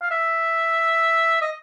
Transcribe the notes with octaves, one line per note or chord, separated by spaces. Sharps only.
F5
E5
D#5